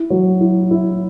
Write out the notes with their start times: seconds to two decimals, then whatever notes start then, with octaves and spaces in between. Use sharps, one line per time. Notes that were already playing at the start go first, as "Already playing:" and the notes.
Already playing: E4
0.10 F#3
0.41 E4
0.71 E4